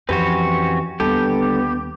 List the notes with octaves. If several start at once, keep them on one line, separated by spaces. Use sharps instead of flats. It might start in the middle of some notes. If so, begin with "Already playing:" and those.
F2 E3 C4 C#4 F#4 G4 B4
D#2 D3 G3 B3 G4 A4